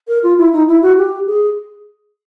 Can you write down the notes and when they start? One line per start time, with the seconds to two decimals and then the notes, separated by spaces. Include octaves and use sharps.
0.08 A#4
0.23 F4
0.38 E4
0.53 D#4
0.68 E4
0.82 F#4
0.98 G4
1.27 G#4